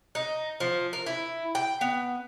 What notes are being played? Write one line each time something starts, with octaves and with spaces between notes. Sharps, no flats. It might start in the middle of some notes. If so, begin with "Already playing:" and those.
D#4
F3
A#4
E4
G5
B3